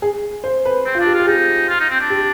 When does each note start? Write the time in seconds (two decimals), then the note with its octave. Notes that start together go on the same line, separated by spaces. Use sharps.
0.02 G#4
0.44 C5
0.65 B4
0.86 C4
0.95 F4
1.00 D4
1.06 G4
1.14 F4
1.20 G4
1.27 D#4 G#4
1.69 F4
1.80 D#4
1.89 C4
2.00 D4
2.10 G4